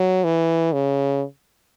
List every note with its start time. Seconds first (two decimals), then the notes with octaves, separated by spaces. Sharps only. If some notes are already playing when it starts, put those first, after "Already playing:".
Already playing: F#3
0.24 E3
0.73 C#3